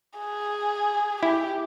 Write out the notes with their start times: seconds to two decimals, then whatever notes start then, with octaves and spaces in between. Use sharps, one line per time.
0.19 G#4
1.23 E4 G4